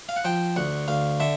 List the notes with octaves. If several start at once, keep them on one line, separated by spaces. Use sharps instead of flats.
F5
F#5
F3 G5
D2 F#5
D2 F5
D3 E5